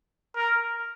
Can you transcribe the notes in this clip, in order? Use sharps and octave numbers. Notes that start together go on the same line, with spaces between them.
A#4